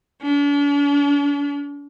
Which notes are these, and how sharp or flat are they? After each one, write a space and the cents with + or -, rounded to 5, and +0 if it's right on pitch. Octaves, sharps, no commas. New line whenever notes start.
D4 -45